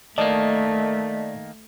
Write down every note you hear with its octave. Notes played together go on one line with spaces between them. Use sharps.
D#3 A3 A#3 D5 D#5 A5